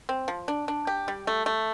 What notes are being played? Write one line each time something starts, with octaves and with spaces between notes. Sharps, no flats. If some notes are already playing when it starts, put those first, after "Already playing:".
C4
F3
D4
D4
G4
G3
A3
A3